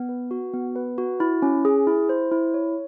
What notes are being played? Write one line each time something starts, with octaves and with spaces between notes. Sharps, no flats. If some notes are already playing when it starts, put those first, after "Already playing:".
Already playing: B3
B4
F#4
B3
B4
F#4
E4
C#4
G#4
E4
C5
E4
C#5